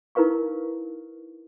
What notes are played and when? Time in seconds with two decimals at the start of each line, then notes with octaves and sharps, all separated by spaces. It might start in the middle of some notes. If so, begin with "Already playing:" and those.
0.15 D#4 E4 A#4 B4 F5 C#6